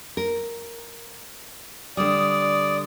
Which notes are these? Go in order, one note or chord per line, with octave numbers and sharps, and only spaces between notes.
A#4
D3 G3 D5 D#6